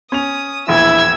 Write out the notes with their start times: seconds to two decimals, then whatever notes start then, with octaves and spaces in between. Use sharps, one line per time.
0.12 C#4 D#6 F7
0.68 E1 A#1 E4 E6 G#6